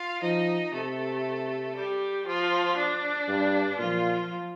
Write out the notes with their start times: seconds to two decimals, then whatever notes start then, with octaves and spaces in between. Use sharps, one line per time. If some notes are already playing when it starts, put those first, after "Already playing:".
Already playing: F4 F5
0.22 F3 D#4 D#5
0.73 C3 A3 A4
1.75 G3 G4
2.27 F3 F4
2.77 D4
3.28 G2
3.79 A#2 F3 F4